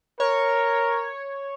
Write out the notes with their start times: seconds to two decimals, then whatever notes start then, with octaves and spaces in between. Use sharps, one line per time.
0.20 A#4 C#5